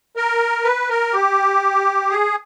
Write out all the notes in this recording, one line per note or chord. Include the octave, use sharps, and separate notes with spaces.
A#4
B4
A#4
G4
G#4